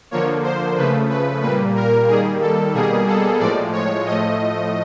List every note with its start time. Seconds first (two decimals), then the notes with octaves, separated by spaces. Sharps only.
0.11 D3 F3 A#3 C#5
0.44 C5
0.77 C#3 F3 A3 B4
1.10 B4
1.42 A#2 G3 A#3 B4
1.75 A#4
2.08 D#3 G3 A#3 G#4
2.41 A4
2.74 B2 G3 A#3 G#4
3.07 A4
3.40 A2 F3 G#3 D5
3.73 C#5
4.05 A2 F3 A3 D#5